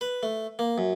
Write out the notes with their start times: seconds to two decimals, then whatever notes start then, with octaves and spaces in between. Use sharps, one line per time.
0.01 B4
0.23 A3
0.59 A#3
0.78 F#2